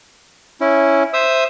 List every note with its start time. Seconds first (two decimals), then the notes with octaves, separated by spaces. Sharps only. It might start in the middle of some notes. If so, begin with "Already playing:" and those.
0.61 C#4 E4
1.13 C5 E5 D#6 E6